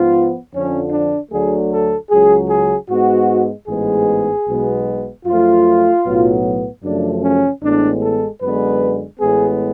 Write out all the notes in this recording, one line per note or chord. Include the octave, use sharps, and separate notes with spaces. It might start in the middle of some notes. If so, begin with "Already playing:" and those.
Already playing: G#2 F3 B3 F4
F2 D3 F3 C#4
D4
D2 D3 F#3 A3 G#4
A4
C#2 C#3 F#3 G#4
G#4
G#2 G#3 B3 F#4
A1 G#2 G#3 B3 G#4
B1 B2 G#3 B3
F#2 F3 A3 F4
B1 A2 F#3 B3
F#2 C#3 F3 A3 D4
C#4
A1 A2 G#3 B3 D4
A4
F#2 D3 G#3 B3 B4
A1 A2 G#3 B3 G#4